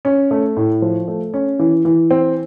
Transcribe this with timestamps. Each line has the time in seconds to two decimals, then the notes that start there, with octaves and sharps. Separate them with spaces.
0.05 C#4
0.31 A3
0.56 A2
0.82 F3
1.08 A3
1.34 C#4
1.59 E3
1.85 E3
2.11 C4